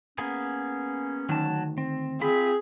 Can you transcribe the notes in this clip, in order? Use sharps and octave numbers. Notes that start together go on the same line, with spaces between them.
A#3 B3 C#4 G#4
D2 D#3 F#3 A5
C4
C4 F4 G#4 B5